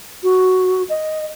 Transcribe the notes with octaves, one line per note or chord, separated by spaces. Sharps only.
F#4
D#5